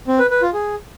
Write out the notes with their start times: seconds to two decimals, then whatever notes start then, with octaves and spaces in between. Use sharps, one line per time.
0.08 C4
0.19 B4
0.30 B4
0.42 F4
0.53 G#4